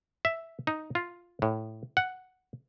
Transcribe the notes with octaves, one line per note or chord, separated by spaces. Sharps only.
E5
D#4
F4
A2
F#5